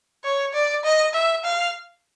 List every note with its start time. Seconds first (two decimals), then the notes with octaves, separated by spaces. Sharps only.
0.24 C#5
0.54 D5
0.84 D#5
1.14 E5
1.44 F5